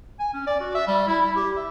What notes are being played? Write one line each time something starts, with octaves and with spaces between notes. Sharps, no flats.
G#5
C#4
D5
F#4
E5
G3
E4
E4
G4
E5